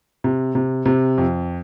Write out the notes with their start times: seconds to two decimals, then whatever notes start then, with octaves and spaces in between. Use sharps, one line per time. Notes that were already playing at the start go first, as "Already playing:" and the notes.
0.24 C3
0.55 C3
0.86 C3
1.18 F2